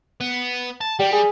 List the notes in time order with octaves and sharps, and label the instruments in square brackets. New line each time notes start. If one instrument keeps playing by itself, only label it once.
[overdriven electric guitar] B3
A5
[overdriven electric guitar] G3 [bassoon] G4
[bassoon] G#4